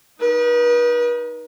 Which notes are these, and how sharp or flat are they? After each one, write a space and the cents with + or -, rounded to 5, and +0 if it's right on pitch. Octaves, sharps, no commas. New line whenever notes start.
D#4 +0 B4 -40